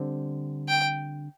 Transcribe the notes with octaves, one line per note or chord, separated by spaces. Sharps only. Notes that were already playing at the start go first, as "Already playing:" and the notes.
Already playing: D3 G3 C4
G5